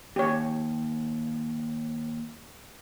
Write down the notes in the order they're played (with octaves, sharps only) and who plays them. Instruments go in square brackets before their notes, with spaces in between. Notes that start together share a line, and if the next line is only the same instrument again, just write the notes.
[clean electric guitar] D#2 [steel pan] G4 C#5